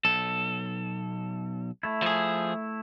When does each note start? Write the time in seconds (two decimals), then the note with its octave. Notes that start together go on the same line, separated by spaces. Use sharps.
0.05 B1 A4
1.83 A3 E4
2.02 F3 G#4